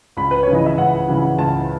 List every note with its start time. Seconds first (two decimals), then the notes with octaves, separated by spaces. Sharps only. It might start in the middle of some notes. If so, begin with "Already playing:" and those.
0.17 C#2 B5
0.31 B4
0.43 C#3 C#5
0.53 E3 D#5
0.66 E5
0.78 C#2 F#5
1.08 C#3 E3
1.38 C#2 A5